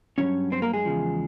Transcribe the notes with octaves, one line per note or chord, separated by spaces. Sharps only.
D#3 F#3 C#4 C#5
G2
C4 C5
A#3 A#4
G#3 G#4
E2 C#3 F3